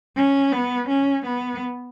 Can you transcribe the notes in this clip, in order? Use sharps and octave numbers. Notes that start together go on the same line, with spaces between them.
C#4
B3
C#4
B3